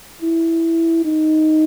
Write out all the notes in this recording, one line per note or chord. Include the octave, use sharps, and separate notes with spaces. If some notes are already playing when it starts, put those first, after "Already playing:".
E4
D#4